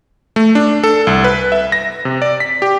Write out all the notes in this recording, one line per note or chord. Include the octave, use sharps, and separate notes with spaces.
A3
D4
A4
C2
B4
E5
A#6
C3
D5
B6
G4